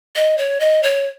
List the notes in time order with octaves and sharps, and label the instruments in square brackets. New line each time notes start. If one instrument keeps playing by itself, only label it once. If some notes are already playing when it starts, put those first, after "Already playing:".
[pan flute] D#5
C#5
D#5
C#5